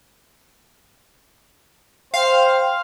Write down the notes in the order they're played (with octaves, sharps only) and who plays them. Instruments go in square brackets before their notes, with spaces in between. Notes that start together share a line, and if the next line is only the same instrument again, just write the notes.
[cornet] C5 [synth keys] F5 [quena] G5